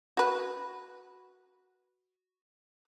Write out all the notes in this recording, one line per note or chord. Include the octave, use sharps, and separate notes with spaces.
F#4 B4